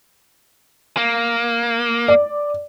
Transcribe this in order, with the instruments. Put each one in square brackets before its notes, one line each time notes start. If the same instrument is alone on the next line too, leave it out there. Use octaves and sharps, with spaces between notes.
[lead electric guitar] A#3
[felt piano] D5